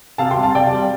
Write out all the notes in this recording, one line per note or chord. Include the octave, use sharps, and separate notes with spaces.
C3 F5 A5
G5 C6
G3
F5 A5
C3 D5 G5
G3